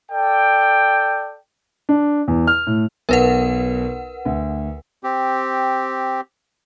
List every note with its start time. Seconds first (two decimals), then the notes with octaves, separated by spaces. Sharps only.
0.10 A4 D5 G5
1.89 D4
2.28 E2
2.47 F6
2.67 A2
3.09 B1 A#4 B4 F#5
4.25 D2
5.04 C4 G4